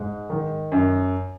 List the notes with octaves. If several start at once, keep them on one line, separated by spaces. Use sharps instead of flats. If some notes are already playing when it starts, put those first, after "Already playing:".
Already playing: G#2
D#3
F#2